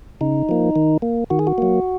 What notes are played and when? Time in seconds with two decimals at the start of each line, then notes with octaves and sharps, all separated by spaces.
0.21 C#3 D#4
0.49 F3 A#3
0.76 D#3
1.02 A#3
1.30 D#3 F#4
1.39 G#4
1.47 F#4
1.58 F#3 A#3